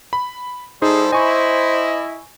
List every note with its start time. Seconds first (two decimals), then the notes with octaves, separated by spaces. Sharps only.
0.13 B5
0.82 G3 D#4 E4 G#4 A4 C5
1.13 E4 D#5 G#5 C#6